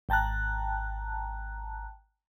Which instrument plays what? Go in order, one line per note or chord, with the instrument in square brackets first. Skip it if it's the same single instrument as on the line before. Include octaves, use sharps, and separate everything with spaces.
[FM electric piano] G#1 G5 A5 A#5 F#6